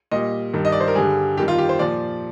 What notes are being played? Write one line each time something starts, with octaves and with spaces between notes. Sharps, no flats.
A#2 G3 D#5
G2 D#3 G3
D#5
D5
C5
A#4
G2 D3 G3 G#4
F2 D#3 G3 G4
F4
G4
C5
A#2 F3 D5